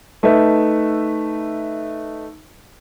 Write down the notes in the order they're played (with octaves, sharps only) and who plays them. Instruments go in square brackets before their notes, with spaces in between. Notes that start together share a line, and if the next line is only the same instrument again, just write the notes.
[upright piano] A3 D#4 B4 E5